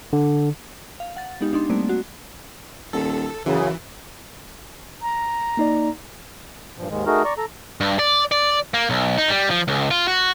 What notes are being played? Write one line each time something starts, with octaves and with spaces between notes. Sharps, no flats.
D3
F5
F#5 A6
G#3 B3 D#4 G4
D4 D#4 C6
G3 A3 A#3 C4 D5
F#4
D#1 A4
F#2 C#3 E3
A#5
A#3 D#4 D5
G2 A#2 F3
D#2 G#2 D#3 G#3
A3 D#4 F#4 G#4 A#4
D5 A#5 C#6
A4 A#5
G2
D5
D5
A#3
B1
D#4
G3
F3
C#2
F4
F#4